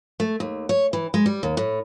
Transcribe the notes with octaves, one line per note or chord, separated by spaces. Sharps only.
A3
D#2
C#5
E3
G#3
G3
D#2
A2